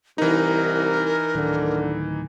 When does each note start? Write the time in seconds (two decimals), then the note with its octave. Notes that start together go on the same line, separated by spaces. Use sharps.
0.18 C2 E3 D#4 A#4
1.35 D1 D3 D#3